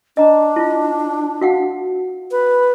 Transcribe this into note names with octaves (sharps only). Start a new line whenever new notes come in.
D4 D#5 A#5
E4 F4
F#4 F5 F#5
B4